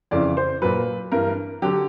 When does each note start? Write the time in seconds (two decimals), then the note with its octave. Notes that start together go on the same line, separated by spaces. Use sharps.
0.11 F2 C#3 E3 D5
0.37 C5
0.62 A#2 F#3 B4
1.12 G2 E3 A#4
1.62 D3 F#3 G4